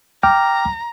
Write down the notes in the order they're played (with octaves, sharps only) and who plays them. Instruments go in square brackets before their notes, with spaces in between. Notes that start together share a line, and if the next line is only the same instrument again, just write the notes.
[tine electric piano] G5 D6 F6 [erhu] A#5